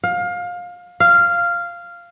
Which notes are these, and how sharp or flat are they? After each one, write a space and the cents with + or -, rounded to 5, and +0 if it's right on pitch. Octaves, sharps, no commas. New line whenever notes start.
F5 +25
F5 -10